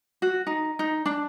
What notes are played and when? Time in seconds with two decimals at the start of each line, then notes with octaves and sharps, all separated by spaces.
0.22 F#4
0.47 D#4
0.79 D#4
1.06 D4